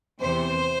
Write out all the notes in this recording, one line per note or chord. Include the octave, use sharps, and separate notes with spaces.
E2 C3 E3 C5